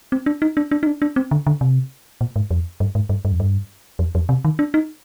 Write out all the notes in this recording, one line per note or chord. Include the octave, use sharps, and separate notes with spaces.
C4
D4
D#4
D4
D4
D#4
D4
D4
C4
D3
D3
C3
A#2
G#2
F2
G2
G#2
G2
G2
F2
G2
F2
F2
C3
D#3
D4
D#4